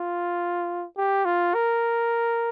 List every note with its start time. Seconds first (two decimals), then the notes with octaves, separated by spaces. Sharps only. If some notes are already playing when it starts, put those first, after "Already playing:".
Already playing: F4
0.97 G4
1.25 F4
1.54 A#4